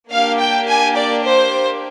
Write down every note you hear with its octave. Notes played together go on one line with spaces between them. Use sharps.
A#3 D4 G4 F5
G5
G#5
D5
C5